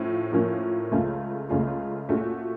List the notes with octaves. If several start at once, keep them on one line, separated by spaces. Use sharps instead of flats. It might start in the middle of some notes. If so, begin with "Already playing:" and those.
Already playing: A2 F3 C#4
A2 F3 A#3 C#4
C#2 C#3 A3 C#4 F4
C#2 C#3 A3 C#4 F4
A#2 A3 C#4 F#4